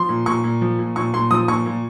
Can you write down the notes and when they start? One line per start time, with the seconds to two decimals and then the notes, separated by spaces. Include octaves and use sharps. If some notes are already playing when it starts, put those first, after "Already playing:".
Already playing: F3 C6
0.09 A#2
0.26 A#2 C#6
0.44 A#2
0.61 F3
0.79 A#2
0.96 A#2 C#6
1.14 A#2 C6
1.31 F3 D#6
1.48 A#2 C#6
1.66 A#2